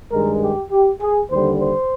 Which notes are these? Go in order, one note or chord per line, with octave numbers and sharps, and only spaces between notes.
G2 D#3 G#3 A#4
G4
G4
G#4
D#2 D3 G3 C5
C5